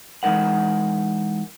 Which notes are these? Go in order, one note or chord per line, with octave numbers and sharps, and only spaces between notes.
E3 G#3 D#4 A#4 F#5